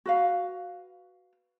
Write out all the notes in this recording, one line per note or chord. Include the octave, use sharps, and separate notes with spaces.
F#4 B4 F5